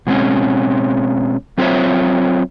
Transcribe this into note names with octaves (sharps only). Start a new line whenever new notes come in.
B2 G#3 C4 C#4
F#3 C4 F4 C5 C#5 E5